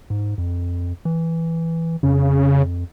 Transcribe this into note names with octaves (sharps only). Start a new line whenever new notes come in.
G#2
F2
E3
F2 C#3